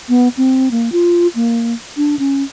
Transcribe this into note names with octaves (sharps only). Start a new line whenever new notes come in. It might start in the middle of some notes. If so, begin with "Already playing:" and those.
B3
C4
A#3
F4
A#3
D4
C#4